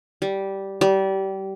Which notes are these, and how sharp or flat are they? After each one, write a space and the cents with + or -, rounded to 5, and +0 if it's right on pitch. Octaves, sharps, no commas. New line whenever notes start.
G3 -10
G3 -25